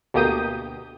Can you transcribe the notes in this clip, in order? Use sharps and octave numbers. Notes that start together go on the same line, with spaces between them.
D2 B2 A#3 G4 D#6 G6